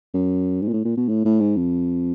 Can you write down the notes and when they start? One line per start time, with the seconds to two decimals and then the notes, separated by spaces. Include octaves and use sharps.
0.14 F#2
0.62 G#2
0.68 A#2
0.73 A2
0.85 A#2
0.97 B2
1.09 A2
1.25 A2
1.41 G#2
1.57 F2